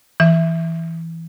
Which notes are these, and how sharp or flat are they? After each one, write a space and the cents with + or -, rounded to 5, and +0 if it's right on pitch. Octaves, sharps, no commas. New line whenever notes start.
E3 +0 E5 +0